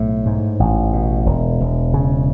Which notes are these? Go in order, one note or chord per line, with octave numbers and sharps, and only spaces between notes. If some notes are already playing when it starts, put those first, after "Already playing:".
Already playing: B1 A2 A3
G#2
A1
B2
E1
E1
C#3